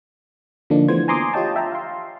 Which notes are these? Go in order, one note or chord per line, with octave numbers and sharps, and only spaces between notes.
D3 F3 A#3 D4 D#4
E3 F3 A3 B3 C5 G#6
G#5 A#5 C6 D6 D#6
F4 G4 C#5 D#5 G5 A5
E5 G5 A5 A#5
F5 C6